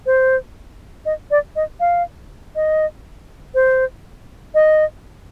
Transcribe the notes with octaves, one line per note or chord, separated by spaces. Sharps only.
C5
D#5
D5
D#5
F5
D#5
C5
D#5